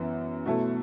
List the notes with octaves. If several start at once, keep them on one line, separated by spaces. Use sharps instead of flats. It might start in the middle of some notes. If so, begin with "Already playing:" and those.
Already playing: F#2 E3 B3
B2 F#3 A3 E4 A4